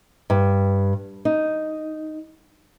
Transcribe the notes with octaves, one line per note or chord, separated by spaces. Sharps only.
G2
D#4